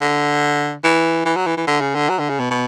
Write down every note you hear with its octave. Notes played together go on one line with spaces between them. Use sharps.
D3
E3
E3
F#3
E3
E3
D3
C#3
D3
F#3
D3
C#3
B2
B2